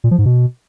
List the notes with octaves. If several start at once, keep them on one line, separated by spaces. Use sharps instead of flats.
A#2
F3
G#2
B2